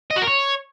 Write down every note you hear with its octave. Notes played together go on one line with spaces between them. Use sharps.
D#5
F#4
A#4
C#5